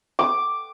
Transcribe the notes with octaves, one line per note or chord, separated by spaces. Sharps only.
D6